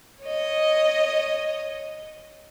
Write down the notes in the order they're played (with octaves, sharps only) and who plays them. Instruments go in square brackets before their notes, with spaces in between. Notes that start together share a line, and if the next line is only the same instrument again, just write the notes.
[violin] C#5 D#5